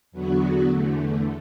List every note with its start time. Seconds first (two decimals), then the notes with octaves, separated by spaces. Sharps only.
0.11 E2 D3 F#3 B3 F#4
0.68 E2 D3 A3